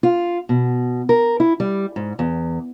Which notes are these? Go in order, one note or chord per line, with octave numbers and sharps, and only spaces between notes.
F4
B2
A#4
E4
G3
G#2
E2